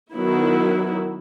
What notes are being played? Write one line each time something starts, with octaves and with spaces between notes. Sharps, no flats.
D#3 F#3 B3 E4